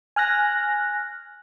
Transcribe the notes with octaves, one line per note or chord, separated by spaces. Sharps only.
G#5 F6 F#6 A#6